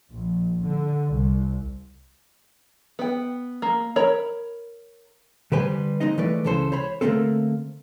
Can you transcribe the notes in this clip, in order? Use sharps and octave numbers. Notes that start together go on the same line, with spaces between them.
A#1
D3
C2
B3 G5
A#3
A#4 C#5 B5
D3 G3 G4 B4 C5 G#5
G#3 A#3 C4 D#4 D#5
E3 G#3 A3 B4 D5
C#2 C#3 E3 A4 C5
C5 C#5 B5
D3 D#3 A3 A#3 C4 A4